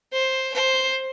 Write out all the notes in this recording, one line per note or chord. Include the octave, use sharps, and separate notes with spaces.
C5
C5